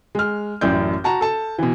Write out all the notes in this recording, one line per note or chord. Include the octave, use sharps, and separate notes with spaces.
G#3 F6
A1 F#2 E4 D5 G6
F#4 A5 A#5
A4 A5
B2 E3